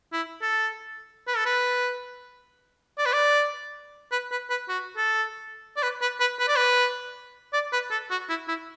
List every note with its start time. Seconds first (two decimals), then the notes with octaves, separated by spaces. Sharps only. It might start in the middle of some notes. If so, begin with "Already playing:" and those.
0.13 E4
0.42 A4
1.27 B4
1.36 A4
1.46 B4
2.98 D5
3.06 B4
3.13 D5
4.12 B4
4.31 B4
4.50 B4
4.69 F#4
4.97 A4
5.77 D5
5.83 B4
6.02 B4
6.20 B4
6.39 B4
6.48 D5
6.56 B4
7.53 D5
7.73 B4
7.91 A4
8.11 F#4
8.29 E4
8.48 E4